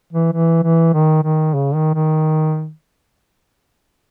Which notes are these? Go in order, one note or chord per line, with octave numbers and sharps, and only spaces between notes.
E3
E3
E3
D#3
D#3
C#3
D#3
D#3